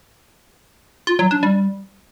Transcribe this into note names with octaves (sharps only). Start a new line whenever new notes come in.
F4
F#3
D4
G3